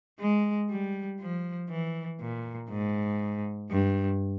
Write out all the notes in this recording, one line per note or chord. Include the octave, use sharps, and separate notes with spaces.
G#3
G3
F3
E3
A#2
G#2
G2